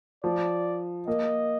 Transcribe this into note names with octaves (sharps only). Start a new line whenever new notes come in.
F3 D5
A#3 D#5